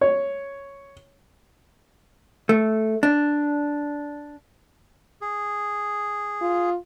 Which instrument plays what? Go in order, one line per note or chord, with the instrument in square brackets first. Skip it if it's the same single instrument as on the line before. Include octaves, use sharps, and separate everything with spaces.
[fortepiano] C#5
[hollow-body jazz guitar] A3
D4
[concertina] G#4
[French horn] F4